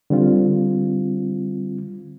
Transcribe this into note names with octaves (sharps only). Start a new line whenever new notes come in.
D3 G3 C4 F4